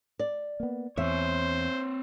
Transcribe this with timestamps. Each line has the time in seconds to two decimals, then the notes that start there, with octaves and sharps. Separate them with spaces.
0.19 D5
0.60 A#3 B3
0.97 E2 C4 C5 C#5 E5